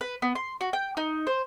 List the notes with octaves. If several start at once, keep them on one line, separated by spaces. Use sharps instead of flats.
B4
B3
C6
F#4
G5
D#4
C5